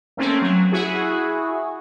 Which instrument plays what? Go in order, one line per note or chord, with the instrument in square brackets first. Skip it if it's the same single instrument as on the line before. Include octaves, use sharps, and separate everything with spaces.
[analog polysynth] A3 A#3 C4 C#4
F#3
E4 F#4 G#4